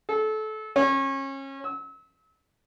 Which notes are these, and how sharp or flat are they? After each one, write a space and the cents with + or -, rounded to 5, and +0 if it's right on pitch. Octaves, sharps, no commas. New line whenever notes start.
A4 -25
C#4 -30
E6 -35